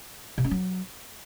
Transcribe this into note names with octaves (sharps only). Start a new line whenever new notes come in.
C3
C#4
F#3